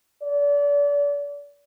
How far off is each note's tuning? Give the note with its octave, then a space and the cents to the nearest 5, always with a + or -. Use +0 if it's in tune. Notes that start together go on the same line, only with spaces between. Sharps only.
D5 -35